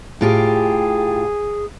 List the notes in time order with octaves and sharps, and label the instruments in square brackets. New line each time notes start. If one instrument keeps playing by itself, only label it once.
[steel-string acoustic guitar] A2 F4 G4 [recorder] G#4